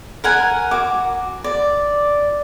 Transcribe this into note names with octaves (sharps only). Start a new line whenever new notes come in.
A#4 F#5 G#5
F#4 D6
D5